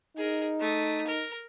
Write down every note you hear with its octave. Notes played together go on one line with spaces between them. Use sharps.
D#4 G#4 A#4
A3 D#6
A#4